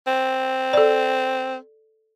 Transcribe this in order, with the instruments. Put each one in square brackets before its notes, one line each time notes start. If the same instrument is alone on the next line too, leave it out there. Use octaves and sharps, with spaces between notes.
[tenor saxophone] C4
[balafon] A4 D5